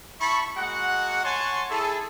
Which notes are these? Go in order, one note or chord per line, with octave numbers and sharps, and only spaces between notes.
E4 A5 B5 C#6
G#3 A#3 F#4 F#5
C#5 F#5 G#5 A5 C6 C#6
E4 G#4 A4